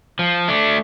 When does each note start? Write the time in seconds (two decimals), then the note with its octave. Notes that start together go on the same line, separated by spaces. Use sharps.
0.19 F3
0.48 A3 D4